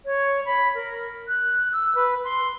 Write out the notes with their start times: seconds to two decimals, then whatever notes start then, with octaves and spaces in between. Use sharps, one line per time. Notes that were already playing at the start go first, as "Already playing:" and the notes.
0.06 C#5
0.46 B5
0.75 A#4
1.28 F#6
1.73 E6
1.95 B4
2.25 C6